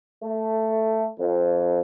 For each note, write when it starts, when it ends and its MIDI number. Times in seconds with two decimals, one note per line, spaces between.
0.24 1.07 57
1.19 1.81 41